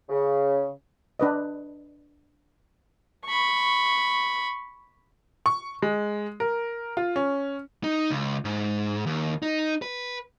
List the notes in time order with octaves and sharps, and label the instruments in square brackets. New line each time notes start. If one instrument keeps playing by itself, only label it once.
[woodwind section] C#3
[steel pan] D4 B4 D#5
[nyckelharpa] B5 C#6
[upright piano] C#6
G#3
A#4
F4
C#4
[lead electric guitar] D#4
C#2
G#2
D#2
D#4
B4